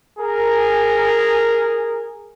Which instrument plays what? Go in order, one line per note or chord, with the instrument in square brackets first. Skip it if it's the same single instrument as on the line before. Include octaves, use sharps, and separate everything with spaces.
[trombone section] G#4 A#4